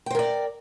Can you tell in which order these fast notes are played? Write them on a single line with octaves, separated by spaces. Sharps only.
G5 C5 A#4 D5